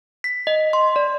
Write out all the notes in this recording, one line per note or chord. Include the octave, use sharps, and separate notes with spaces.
B6
D#5
C6
D5